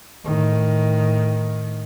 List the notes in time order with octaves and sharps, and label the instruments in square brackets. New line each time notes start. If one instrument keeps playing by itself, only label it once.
[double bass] A2 D#3